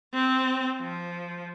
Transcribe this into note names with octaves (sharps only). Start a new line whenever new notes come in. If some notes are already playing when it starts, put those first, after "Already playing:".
C4
F3